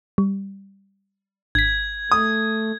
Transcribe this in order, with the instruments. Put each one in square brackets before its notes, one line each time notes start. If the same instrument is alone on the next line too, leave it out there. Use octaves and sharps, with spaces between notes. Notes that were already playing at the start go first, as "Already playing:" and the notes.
[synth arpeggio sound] G3
[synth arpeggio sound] G#1 B6 [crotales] G#6
[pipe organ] A3 [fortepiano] D#6